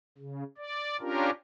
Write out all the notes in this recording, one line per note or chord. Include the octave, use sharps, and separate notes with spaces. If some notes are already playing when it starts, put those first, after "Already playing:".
C#3
D5
C#4 D4 F4 G4 A#4